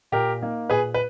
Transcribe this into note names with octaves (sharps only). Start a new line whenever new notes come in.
A#2 G4 A#4
A#3 D#4
A#2 G#4 B4
B4